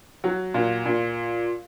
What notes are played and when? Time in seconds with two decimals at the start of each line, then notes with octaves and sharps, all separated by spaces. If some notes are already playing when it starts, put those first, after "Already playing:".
0.24 F#3
0.54 A#2
0.86 A#2